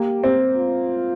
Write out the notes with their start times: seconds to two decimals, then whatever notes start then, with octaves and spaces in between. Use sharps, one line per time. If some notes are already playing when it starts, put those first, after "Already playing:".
Already playing: A#3 G4
0.24 C4
0.57 F4